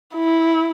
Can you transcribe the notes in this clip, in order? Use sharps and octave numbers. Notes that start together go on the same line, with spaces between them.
E4